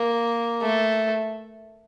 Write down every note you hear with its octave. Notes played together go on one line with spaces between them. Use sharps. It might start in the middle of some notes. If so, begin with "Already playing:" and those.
Already playing: A#3
A3